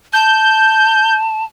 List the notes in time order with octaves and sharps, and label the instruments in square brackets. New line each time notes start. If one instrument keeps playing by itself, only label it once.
[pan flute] A5 [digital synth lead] G6